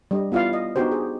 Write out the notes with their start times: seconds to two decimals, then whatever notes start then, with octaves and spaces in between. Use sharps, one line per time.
0.11 G3 D4 D#5
0.32 B3 E4 F4 D5 F5
0.53 D#5
0.76 B3 D4 D#4 F#4 G4 C5
0.92 G#4